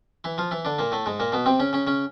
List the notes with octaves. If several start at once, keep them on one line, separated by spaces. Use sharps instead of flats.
E3 E4
F3 F4
E3 E4
D3 D4
A#2 A#3
A2 A3
G#2 G#3
A#2 A#3
B2 B3
C3 C4
C#3 C#4
C#3 C#4
C#3 C#4